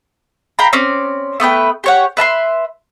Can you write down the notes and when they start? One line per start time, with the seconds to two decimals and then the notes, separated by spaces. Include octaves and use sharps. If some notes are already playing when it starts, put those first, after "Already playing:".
0.59 F5 G5 A#5 B5
0.73 C4 C#4 D5
1.40 A3 B3 B4 G5
1.84 G4 C#5 F#5
2.17 B4 E5 A5 C6